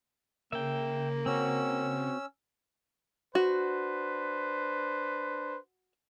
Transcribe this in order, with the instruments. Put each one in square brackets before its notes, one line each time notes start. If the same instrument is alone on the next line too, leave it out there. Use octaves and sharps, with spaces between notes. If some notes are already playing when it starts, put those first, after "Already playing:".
[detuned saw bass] C#3 [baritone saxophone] A#3 [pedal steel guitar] E5 G5
[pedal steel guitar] C4 F#4 [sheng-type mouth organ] C#4 E6
[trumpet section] D4 B4 C5 [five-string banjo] F#4